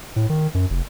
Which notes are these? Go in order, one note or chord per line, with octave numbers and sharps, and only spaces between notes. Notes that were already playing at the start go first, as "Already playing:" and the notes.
A2
D#3
F#2
F1